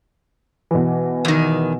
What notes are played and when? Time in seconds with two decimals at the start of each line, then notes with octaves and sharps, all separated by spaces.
0.71 B2 E3
1.25 E2 D#3